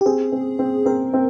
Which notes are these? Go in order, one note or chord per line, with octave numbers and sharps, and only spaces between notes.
G4
C4 G#4
C4
C4
C4 A#4
C4